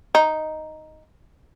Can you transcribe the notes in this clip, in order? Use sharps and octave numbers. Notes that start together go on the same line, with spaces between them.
D#4